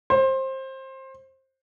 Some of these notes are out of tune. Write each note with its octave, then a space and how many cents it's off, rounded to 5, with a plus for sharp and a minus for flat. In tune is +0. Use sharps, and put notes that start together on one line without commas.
C5 +20